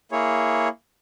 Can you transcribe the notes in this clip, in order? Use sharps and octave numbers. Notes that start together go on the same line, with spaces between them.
A#3 E4 G#4 C#5